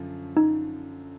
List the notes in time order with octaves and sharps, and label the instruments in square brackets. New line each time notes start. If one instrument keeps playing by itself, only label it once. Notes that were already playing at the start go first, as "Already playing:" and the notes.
Already playing: [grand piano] F#2 D3 F3
[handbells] D#4